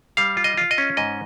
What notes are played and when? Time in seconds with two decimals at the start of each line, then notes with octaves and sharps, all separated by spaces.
0.17 G3 F5
0.37 F4
0.44 D#5
0.57 F4
0.71 D#5
0.78 C#4
0.97 G#2 D#5